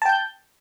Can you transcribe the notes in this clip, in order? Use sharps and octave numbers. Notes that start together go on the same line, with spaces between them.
G5 A5 G6